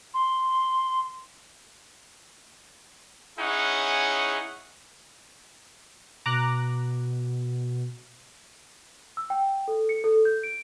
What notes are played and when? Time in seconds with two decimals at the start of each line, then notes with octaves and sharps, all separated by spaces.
0.14 C6
3.39 C#4 D#4 E4 G#4 C#5 F#5
6.26 B2 A#5 D6 F#6
9.17 E6
9.30 G5
9.68 A4
9.89 C#7
10.04 A4
10.25 G6
10.43 D7